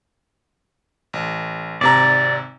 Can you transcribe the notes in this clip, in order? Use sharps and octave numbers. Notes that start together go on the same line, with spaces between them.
A1
G#1 C3 D5 A#5